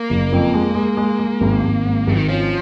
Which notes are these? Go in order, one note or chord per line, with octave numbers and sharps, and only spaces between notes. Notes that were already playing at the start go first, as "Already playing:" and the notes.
Already playing: A#3
F#1
F2
G#3
G#3
G#3
G#3
G#1
G#1
G#2
G#1
D#3
F3 C#4